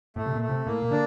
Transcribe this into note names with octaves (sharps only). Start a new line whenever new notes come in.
A2 A3
C3
A#2
A3
C3
A2 A#3
A#2
D3 D4